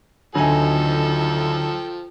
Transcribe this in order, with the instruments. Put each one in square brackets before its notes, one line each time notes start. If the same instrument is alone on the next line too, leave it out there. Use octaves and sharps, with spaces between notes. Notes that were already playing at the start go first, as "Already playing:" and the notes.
[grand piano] D2 G#5 [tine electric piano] D3 [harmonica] F3 A4 G5 [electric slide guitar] F#3 D#4